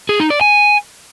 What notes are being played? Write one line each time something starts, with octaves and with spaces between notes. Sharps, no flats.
G#4
D#4
D5
G#5